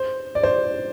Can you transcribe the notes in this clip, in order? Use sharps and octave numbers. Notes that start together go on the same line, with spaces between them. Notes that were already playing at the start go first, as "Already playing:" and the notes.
Already playing: C5
D5
C5